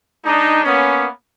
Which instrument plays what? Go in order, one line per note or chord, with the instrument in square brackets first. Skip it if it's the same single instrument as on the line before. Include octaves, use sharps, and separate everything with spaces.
[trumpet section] G#3 D4 D#4
A#3 B3 C#4